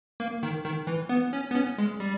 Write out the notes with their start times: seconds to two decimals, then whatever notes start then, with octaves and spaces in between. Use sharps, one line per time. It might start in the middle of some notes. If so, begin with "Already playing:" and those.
0.20 A#3
0.43 D#3
0.65 D#3
0.87 E3
1.09 B3
1.33 C#4
1.51 B3
1.55 C#4
1.78 G#3
2.00 G3